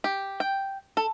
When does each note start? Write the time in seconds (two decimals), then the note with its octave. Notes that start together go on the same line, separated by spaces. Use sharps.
0.04 G4
0.40 G5
0.97 A4